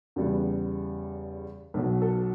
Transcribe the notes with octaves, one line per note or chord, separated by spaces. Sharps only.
E2 C#3 G3 B3
B1 B2 F#3
A4